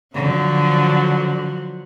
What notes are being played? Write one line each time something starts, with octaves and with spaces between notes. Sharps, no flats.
D3 F3 F#3